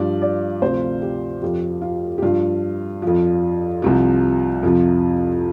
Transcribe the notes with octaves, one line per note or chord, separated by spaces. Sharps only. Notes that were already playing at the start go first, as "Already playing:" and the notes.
Already playing: G2 F3 D5
D5
D2 C3 F3 C5
G4
F2 F3 G4
F4
G4
G2 F3 F4
F2 F3
C2 C3 F3
F2 C3 F3